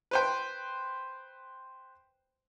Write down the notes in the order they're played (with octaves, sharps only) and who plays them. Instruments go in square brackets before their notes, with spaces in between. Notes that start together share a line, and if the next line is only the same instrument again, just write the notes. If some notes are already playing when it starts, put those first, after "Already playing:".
[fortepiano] B4 C5 G5